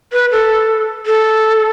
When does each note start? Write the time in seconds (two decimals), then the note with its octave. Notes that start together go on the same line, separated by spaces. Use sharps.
0.13 B4
0.31 A4
1.06 A4